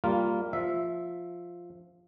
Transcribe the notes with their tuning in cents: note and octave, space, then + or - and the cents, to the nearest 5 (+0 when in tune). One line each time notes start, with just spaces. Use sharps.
G3 +0 A#3 -15 F4 +0
F3 +0 E5 +0